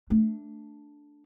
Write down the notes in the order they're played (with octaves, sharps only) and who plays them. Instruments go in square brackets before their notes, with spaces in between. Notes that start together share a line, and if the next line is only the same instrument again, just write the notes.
[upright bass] A3 D4